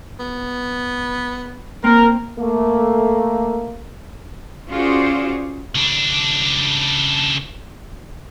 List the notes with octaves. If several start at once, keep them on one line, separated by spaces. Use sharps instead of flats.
B3
A#3 C4 A#4
A3 A#3
C#4 F4 F#4 G#4 C5 D5
C#3 D4